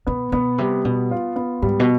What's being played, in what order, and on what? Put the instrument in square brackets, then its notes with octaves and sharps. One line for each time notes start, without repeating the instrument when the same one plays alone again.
[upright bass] B2 [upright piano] B3
[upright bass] B2 [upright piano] B3
[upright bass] C3 [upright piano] G3
[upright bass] B2 [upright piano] B3
[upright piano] F4
B3
[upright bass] G#2 [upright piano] G3
[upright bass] B2